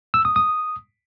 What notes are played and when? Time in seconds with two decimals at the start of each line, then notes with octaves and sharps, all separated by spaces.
0.14 E6
0.25 D#6
0.36 D#6